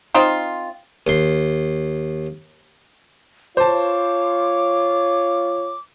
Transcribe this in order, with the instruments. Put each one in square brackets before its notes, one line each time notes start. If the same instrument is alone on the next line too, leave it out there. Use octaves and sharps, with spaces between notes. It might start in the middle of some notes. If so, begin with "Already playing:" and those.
[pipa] C4 D#4 F4
[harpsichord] D#2 C6
[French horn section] F4 C#5 [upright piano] C5 A5 [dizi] D6